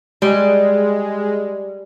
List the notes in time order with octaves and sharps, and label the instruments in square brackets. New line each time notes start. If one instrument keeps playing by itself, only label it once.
[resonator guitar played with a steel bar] G3 [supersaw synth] G#3